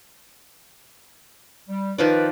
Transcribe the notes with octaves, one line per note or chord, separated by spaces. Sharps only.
G3
D#3 F3 B4 D5